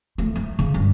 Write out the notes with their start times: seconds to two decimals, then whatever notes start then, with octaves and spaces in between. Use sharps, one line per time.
0.18 A3
0.36 A3
0.59 C#3
0.74 G2